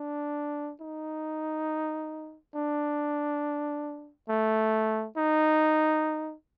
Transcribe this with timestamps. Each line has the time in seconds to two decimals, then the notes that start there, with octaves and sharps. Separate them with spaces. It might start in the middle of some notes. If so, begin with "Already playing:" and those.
Already playing: D4
0.81 D#4
2.55 D4
4.29 A3
5.17 D#4